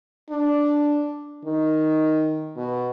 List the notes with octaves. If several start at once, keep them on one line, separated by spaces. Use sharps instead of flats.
D4
D#3
B2